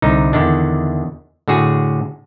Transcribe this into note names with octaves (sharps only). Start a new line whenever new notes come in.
C2 D3 D#4
E2 D3 D#3 D4
A2 D3 F#4 G#4